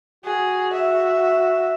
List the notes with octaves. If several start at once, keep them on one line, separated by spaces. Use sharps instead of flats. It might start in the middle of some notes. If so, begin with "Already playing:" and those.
F#4 G#4
E5